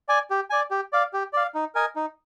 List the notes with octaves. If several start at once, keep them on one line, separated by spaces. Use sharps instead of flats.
D5 G#5
G4
D5 G#5
G4
D5 F5
G4
D5 F5
D#4
A#4 D#5 G#5
D#4